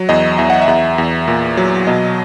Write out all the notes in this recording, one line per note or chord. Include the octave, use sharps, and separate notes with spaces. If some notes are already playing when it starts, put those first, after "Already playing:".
Already playing: F#3
E2 D#5
E2 E5
F#5
E5
E2
E2
A#2
F#3
B2 D#5